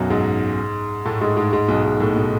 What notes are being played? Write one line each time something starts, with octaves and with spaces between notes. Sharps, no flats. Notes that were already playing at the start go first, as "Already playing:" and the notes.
Already playing: B1 F#2 B2 F#3
G#2 G#3
A2 A3
G#2 G#3
G#2 G#3
G#2 G#3
B1 B2
G#2
A2
B2